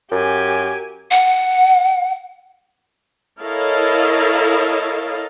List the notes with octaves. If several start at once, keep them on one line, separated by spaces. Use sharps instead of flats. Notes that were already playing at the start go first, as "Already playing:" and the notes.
F#2 G4 G#5
F#5
E4 A4 A#4 C#5 D#5 F5